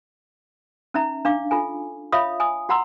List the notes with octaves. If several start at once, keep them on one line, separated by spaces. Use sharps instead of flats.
C#4 D#4 E5 A#5
D4 F5 D6
F4 A4 G#5
F4 C#5 E5 F5 B5 D#6
G#5 D#6
F#4 F#5 A#5 C6 E6